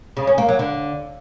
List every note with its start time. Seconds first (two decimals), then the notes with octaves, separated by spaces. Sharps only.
0.17 C#3
0.27 C#4
0.38 A#3
0.49 F#3
0.59 D3